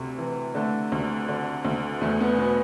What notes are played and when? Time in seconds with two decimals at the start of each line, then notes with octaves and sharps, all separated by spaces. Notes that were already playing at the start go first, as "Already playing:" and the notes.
Already playing: D2 C3
0.18 E3
0.55 D3 A3
0.92 D2
1.29 D3
1.65 D2
2.01 E2 A3
2.20 B3
2.38 B2 B3